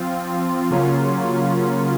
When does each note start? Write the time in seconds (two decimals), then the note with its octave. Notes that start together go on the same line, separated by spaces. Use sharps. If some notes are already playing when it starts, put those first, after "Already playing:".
Already playing: F3 C4 F4
0.71 C#3 F#3 A#3 C#4 F4